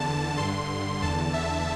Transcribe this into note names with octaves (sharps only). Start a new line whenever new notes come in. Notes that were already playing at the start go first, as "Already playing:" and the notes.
Already playing: E2 D3 A5
G2 D3 C6
E2 D3 A5
E5